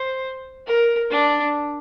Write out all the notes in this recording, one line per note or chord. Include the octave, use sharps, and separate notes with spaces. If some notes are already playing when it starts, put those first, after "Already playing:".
Already playing: C5
A#4
D4